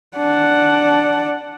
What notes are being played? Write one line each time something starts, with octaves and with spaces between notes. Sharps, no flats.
D4 F#5